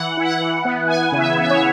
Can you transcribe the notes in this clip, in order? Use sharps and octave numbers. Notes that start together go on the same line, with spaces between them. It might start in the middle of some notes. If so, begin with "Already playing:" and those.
Already playing: E3 F#5
E4
F#5
E3
B3
B3 G#5
C#3
E5
B3
E5
C#5